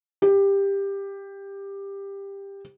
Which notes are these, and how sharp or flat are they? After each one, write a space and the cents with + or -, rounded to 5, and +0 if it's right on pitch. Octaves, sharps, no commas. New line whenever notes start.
G4 +15